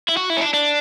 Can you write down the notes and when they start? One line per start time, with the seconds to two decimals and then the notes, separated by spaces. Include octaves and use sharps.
0.08 E4
0.17 F#4
0.30 E4
0.37 C#4
0.41 D4
0.54 D4